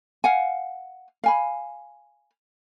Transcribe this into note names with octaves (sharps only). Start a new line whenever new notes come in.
F5 F#5 G#5
F5 G#5 B5